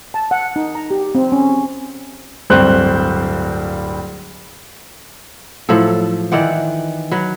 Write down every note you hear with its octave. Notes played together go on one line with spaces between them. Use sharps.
A5
F#5
D#4
A#5
G4
C4
C#4
D1 G2 C4 C5 F#6
A2 F3 F#3 A4
D#3 E3 D5 F#5
F#3 B4